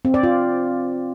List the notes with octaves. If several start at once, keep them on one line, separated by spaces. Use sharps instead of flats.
C4
D5
F4